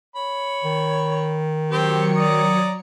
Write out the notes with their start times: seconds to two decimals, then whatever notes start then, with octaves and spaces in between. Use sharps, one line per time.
0.16 C#5 B5
0.64 D#3
1.71 F#3 C4 G4 C#5 C#7
2.16 D5 A#5 D#6